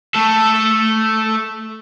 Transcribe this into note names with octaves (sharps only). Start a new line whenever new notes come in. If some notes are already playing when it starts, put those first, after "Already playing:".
A3 A4